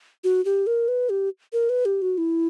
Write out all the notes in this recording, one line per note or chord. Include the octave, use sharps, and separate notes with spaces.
F#4
G4
A#4
B4
G4
A#4
B4
G4
F#4
E4